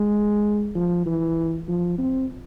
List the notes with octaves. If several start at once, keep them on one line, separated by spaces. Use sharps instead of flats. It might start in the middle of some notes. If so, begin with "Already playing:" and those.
Already playing: G#3
F3
E3
F3
C4